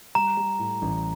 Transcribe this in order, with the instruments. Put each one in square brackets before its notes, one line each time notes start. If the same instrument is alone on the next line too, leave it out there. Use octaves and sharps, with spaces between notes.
[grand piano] G3 [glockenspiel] A#5
[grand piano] G3
A2
A1